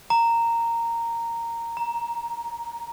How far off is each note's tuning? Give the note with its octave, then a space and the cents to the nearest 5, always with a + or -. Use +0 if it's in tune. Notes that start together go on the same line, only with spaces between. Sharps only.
A#5 -10
A#5 +15